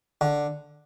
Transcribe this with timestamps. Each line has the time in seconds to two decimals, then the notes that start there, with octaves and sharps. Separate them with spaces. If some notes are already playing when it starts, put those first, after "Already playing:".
0.21 D3